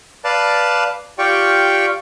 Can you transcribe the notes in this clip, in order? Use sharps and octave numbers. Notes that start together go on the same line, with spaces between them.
B4 D5 F5 A5
F4 G4 D5 G5 C#6